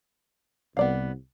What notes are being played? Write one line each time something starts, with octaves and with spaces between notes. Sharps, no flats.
C2 B3 D5 F5